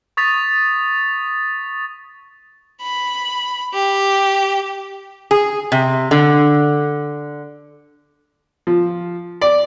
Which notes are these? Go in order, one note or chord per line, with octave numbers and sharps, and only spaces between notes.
C#6 D#6 A6 B6 F7
B5
G4
G#4
C3
D3
F3
D5